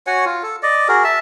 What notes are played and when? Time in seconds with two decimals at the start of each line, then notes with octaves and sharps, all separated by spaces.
0.07 F#4 C#5 F#5 G#5
0.25 F4
0.43 A4
0.63 D5 D#5
0.89 F#4 G#4 A#4
1.04 E5 A5